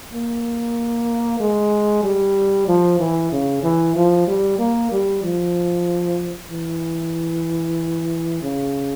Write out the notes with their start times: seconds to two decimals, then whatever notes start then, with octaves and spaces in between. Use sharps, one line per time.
0.13 A#3
1.40 G#3
2.04 G3
2.68 F3
2.99 E3
3.32 C#3
3.63 E3
3.96 F3
4.27 G3
4.59 A#3
4.92 G3
5.23 F3
6.51 E3
8.42 C#3